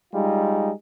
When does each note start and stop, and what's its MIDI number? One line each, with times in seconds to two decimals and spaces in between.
0.13 0.71 55
0.13 0.71 56
0.13 0.71 63
0.13 0.71 65